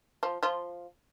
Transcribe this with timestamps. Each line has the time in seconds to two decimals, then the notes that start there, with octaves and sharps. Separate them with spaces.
0.23 F3 F4
0.43 F3 F4